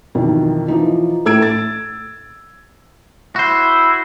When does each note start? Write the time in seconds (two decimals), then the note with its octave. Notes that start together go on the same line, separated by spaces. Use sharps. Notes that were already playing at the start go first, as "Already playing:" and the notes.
0.15 B1 F2 D#3 E3
0.68 E3 F3 D#4
1.25 A2 A3 A4 E6 G#6 D7
1.42 A6
3.36 E4 F#4 C5